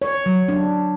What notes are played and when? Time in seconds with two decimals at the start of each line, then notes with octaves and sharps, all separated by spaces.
0.02 C#5
0.26 F#3
0.49 D4